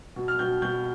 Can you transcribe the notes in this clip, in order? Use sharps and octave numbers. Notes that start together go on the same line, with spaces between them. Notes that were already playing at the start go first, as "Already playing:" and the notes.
B2
F6
B2 G6
B2 G6